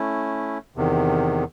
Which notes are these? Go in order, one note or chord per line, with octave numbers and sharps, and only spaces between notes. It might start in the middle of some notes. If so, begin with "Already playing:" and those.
Already playing: A3 C#4 E4
E2 C3 D#3